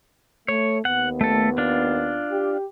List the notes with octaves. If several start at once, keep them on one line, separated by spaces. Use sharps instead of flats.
A3 C#5
D#2 B3 F#5
A3 A4
D4 F4
G4